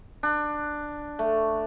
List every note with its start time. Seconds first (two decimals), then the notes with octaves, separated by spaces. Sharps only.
0.23 D4
1.19 A3